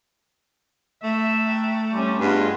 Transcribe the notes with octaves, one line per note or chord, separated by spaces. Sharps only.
A3 E5
G5 A#5 F#6
G3 C#4 G#5 C6 D6
G2 B3 F4 G#4 D#5 G#5